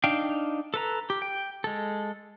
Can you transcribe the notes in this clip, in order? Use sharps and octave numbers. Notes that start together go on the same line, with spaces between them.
D4 D#4 F5 G5
A4 B4 A#5
G4
G5
G#3 A4